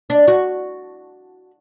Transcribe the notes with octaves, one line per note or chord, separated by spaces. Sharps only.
D4
F#4